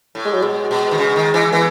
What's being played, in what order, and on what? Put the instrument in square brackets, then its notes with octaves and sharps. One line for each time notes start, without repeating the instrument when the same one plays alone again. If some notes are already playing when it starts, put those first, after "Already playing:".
[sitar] A2
[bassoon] G#3
F#3
[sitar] B2 [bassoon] G#3
[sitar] B2
D#3
C#3
D#3
E3
[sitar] E3 [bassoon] B3